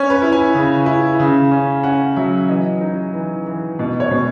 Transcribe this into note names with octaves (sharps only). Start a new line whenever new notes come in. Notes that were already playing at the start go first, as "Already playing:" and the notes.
Already playing: C#4 C#5
B4
E4
G#5
C#3
E4
C#3
C#4
C#4 F#5
F#3 E5
E3 D#5
D#4
E3
E3
B2 D#5
C#5
B2